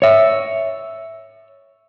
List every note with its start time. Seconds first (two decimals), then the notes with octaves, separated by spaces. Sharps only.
0.02 C#5 E5